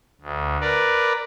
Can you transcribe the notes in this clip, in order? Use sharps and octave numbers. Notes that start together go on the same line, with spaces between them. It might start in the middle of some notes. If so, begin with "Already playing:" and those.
D2
A#4 B4 D5